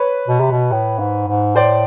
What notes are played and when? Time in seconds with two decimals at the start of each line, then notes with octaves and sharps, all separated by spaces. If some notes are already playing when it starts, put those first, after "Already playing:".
Already playing: B4 C#5
0.28 B2
0.40 C3
0.51 B2
0.72 A2
0.99 G#2
1.28 G#2
1.56 A2 C5 D5